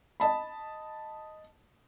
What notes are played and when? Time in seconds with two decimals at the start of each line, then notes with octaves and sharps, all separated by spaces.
0.20 D#5 A5 B5